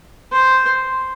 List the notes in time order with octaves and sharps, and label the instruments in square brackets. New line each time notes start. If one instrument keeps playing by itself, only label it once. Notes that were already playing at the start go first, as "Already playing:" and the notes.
[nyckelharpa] C5